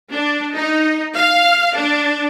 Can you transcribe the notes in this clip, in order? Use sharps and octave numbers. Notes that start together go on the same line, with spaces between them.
D4
D#4
F5
D4